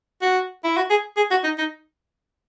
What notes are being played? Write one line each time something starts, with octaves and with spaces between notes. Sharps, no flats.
F#4
E4
F#4
G#4
G#4
F#4
D#4
D#4